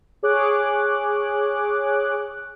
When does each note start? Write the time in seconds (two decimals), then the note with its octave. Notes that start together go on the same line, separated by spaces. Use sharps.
0.23 G#4 C#5 D6 F#6